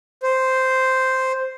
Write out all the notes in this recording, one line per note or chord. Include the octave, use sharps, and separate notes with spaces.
C5